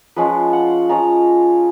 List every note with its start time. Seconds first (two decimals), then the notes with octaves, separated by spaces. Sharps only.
0.16 F3 G#3 C#4 F4 B4
0.53 F#5
0.89 F3 G#3 C#4 F4 A#5